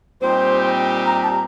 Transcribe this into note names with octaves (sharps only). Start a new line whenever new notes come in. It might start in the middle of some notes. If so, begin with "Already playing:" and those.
A#2 G3 C4 D#4 G4 C5
A#5
A5
A#5